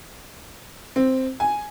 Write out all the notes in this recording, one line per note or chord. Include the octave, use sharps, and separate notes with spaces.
C4
G#5